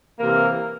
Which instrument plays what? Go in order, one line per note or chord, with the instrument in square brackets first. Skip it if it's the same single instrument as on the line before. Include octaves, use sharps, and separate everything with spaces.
[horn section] C3 E3 A#3 A#4